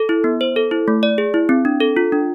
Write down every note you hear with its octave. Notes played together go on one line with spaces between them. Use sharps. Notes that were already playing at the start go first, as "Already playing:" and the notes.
Already playing: A4
E4
B3
C5
A4
E4
A3
D5
G#4
E4
C4
D4
A4
F4
D4